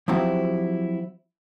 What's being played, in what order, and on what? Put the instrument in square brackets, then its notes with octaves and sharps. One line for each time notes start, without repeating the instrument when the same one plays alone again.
[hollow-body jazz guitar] F3 F#3 C4 E4 F#4 G4